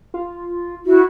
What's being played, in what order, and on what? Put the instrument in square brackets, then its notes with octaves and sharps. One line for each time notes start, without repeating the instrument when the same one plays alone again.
[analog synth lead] F4
[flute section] E4 F#4